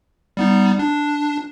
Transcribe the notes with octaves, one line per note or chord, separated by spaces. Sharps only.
G3 B3 D#4
D4